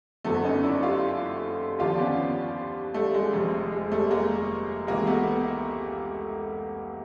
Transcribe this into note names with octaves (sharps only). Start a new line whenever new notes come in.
F#1 F#2 D3 A3 B3
C#4 D#4
D4 E4
F4 G4
D#2 D3 F3 F4 G4
D4
B3 C#4
G3 A3
G#3
F1 F2 C3
G#3
G3 A3
G#3 A#3
C#2 C3 E3 G#3 A#3
A3 B3